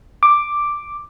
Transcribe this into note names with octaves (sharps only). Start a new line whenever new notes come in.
D6